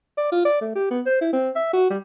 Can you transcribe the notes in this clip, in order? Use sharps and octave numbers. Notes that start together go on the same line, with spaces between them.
D5
F4
D5
A3
G4
B3
C5
E4
C4
E5
F#4
G3